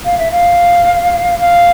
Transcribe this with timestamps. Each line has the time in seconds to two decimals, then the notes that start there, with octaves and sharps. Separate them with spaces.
0.05 F5
0.18 E5
0.32 F5
1.40 F5